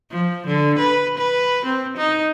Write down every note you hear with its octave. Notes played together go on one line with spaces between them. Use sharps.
F3
D3
B4
B4
C4
D#4